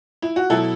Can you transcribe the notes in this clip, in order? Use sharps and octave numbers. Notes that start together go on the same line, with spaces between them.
E4
F#4
B2 F#3 E4 A4